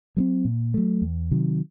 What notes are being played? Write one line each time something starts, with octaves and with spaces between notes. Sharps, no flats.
F#3 A3 C4
A#2
F#3 A3
E2
C3 D#3 F#3